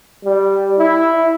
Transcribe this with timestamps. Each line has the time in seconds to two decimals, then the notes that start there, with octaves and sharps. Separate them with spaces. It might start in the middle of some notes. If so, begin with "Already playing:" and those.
0.24 G3
0.78 E4